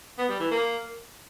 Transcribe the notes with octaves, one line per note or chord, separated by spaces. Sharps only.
B3
G3
E3
A#3